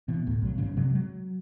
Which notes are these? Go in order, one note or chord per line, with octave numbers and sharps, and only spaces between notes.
B2 E3
D2 A2
B1 F#3
G1 G#2 C#3
C3 F#3 G#3
F#3